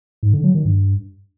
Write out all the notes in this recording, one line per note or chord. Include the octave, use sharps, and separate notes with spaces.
G#2
D3
F#3
D#3
G2